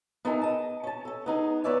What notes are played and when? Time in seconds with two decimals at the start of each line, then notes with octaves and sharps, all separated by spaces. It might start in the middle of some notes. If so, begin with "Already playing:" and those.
0.25 B3 D#4 G#4 A#4 E5 G#5
0.42 D#5 A5
0.83 C#4 A5
1.05 C#4 A4
1.26 B3 D#4 G#4
1.64 B3 B4 C#5 D5 E5 G#5